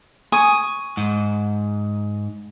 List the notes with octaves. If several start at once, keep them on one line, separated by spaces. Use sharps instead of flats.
G#5 C#6 D#6
G#2